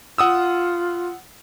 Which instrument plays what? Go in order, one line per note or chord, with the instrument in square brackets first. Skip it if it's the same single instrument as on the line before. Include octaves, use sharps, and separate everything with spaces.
[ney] F4 [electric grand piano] F#5 D#6 E6